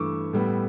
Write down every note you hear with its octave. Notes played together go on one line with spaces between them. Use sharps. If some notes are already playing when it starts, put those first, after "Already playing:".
Already playing: G2 E3 A3 C#6 D6 E6
A2 G3 B3